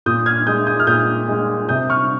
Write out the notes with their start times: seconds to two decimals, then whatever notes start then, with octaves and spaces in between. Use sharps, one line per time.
0.06 A#2 D#6 G6
0.26 F6 G#6
0.47 G#3 D#6 G6
0.67 D#6 G6
0.80 F6
0.87 A#2 D#6 G6
1.29 G#3
1.68 C3 D#6 G6
1.90 C#6 F6